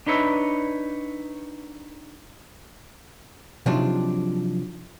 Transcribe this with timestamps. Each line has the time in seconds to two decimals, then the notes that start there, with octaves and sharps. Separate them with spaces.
0.07 D4 D#4 B4 C#5 E5
3.66 C3 F3 F#3 D4 D#4 F4